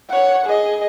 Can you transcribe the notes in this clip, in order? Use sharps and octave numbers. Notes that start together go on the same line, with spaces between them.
C#5 F#5
G#4 D#5